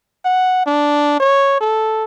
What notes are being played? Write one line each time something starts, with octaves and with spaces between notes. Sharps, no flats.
F#5
D4
C#5
A4